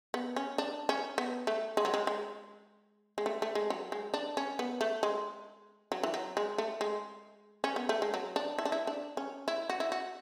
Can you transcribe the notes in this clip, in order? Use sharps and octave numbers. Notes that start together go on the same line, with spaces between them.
B3
C#4
D4
C#4
B3
A3
G#3
F#3
G#3
G#3
G#3
A3
A3
G#3
F#3
G#3
D4
C#4
B3
A3
G#3
F#3
E3
F#3
G#3
A3
G#3
C#4
B3
A3
G#3
F#3
D4
E4
D4
E4
D4
C#4
E4
F#4
E4
F#4